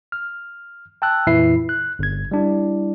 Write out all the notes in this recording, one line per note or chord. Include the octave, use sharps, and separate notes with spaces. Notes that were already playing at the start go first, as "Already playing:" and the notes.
F6
G5 A5 E6 F#6
F2 A#2 E3 E4 E5 C7
F#6
G1 G#6
G3 D4 E4